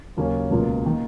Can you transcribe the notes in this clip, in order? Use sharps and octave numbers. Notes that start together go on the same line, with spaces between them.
D#2 C#3 F#3 A#3 C#4
C#2 B2 A#3 F4
D#3 A#3